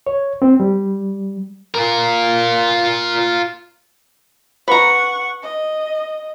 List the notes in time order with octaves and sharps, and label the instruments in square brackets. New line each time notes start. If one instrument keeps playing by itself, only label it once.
[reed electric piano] C#5
C4
G3
[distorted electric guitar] F4 A#4
[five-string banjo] B4 A#5 [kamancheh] F#5 C#6
[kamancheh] D#5